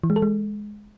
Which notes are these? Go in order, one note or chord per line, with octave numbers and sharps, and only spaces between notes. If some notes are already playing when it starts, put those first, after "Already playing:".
E3
G#3
A4
G#3